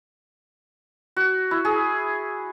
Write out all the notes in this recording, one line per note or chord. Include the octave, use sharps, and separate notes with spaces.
F#4
E4
G#4